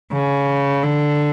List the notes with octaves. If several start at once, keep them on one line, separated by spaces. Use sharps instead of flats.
C#3
D3